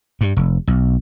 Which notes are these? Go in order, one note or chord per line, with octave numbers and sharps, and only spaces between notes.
G2
F1
B1